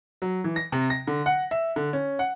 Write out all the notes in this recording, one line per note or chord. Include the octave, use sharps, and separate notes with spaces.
F#3
E3
A#6
C3
A#6
D3
F#5
E5
D3
C#4
F#5